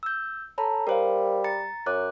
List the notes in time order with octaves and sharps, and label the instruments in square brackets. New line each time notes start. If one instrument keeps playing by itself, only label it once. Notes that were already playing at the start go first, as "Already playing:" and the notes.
[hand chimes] E6 G6
[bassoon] A4 [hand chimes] C#5 A#5 B5
[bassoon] G3 [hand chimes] A#4 C5 F5
[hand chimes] A#5 A6 C#7
[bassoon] F#2 [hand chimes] C#5 D6 F#6